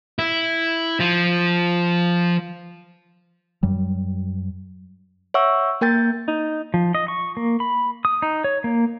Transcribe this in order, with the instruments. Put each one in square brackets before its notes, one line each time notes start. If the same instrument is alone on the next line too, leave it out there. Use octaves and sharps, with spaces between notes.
[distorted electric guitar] E4
F3
[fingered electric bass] F#2 F#3 G3
[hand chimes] C#5 E5 F#5 C#6 E6
A#3 A#4 G5 G6 A6
[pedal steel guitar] D#4
F3
D#5
C#6
A#3
B5
D#6
D#4
C#5
A#3